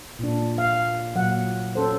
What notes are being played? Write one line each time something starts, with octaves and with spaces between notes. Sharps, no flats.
A#2 D4
F5
A#2 F#3 F#5
C#4 A4 C5